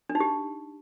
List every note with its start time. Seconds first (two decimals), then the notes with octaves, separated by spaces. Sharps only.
0.09 D4
0.15 D#4
0.20 G4